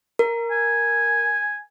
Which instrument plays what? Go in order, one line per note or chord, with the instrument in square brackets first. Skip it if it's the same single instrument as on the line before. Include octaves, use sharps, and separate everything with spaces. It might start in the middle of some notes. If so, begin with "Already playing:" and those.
[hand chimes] A#4
[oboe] G#5